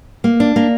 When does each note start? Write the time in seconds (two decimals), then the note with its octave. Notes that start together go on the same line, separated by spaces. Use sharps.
0.24 A#3
0.40 D4
0.56 A#3